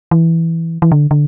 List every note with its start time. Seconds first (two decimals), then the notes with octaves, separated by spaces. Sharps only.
0.11 E3
0.82 E3
0.92 D3
1.11 D3